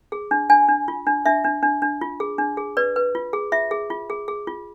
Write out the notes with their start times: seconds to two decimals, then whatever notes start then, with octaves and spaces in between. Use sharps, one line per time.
0.12 G#4
0.31 D4
0.50 D4 G#5
0.69 D4
0.88 F4
1.07 D4
1.26 D4 E5
1.44 D4
1.63 D4
1.82 D4
2.01 F4
2.20 G#4
2.38 D4
2.57 G#4
2.77 B4 D5
2.96 B4
3.15 F4
3.33 G#4
3.52 F4 E5
3.71 G#4
3.90 F4
4.10 G#4
4.28 G#4
4.47 F4